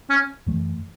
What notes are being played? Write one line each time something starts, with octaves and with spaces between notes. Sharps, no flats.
C#4
F#2 E3 A3